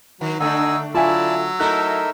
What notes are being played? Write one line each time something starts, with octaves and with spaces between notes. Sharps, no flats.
D#3 F#3
D3 A3 D4 D#4 F#4 G#5 E6
F#3 E4 F4 D5 E5 G#5 A5 E6
A3 D#4 E4 A4 A#4 E5 F#6